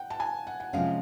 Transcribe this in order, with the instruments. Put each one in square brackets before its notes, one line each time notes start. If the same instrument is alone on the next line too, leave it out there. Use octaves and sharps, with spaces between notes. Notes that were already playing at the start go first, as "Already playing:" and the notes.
Already playing: [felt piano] F#5 G5
A5
G#5
F#5
F#5
[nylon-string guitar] C3 F3 G#3 C#4 [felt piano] F5